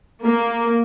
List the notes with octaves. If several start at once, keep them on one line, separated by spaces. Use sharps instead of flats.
A#3